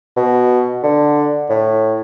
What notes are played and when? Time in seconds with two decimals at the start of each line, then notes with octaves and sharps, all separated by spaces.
0.16 B2
0.83 D3
1.50 A2